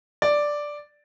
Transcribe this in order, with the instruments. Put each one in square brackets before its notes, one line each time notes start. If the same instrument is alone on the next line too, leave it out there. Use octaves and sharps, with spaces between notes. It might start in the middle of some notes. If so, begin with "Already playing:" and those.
[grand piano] D5